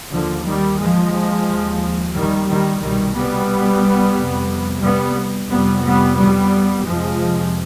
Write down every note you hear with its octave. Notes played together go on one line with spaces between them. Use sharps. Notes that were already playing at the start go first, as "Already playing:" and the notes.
D#2 D3 F3
D#3 G3
F3 G#3
D#2
D#3 G3
D#3 G3
C2 B2 D#3 G3
G3 B3
F2 C3
G3 B3
F2 C3 G3 B3
G3 B3
G3 B3
F2 C3 F3 G#3